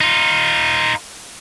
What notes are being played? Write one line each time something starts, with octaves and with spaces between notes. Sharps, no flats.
D#4 F4